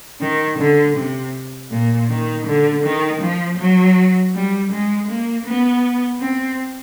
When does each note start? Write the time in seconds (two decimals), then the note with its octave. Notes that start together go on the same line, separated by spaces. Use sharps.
0.21 D#3
0.59 D3
0.96 C3
1.71 A#2
2.09 D#3
2.46 D3
2.84 D#3
3.21 F3
3.58 F#3
4.34 G3
4.71 G#3
5.08 A#3
5.46 B3
6.20 C4